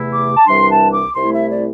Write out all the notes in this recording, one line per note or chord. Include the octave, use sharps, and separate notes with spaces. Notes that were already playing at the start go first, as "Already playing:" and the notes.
Already playing: E2 C3 A3 E4
D6
A5
C2 C3 E3 G3 D4 C6
A5
D6
C2 C3 A3 E4 C6
E5
D5